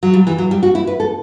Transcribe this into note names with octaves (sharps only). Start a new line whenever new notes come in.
F#3
G3
E3
F#3
G3
F#4
E4
B4
A4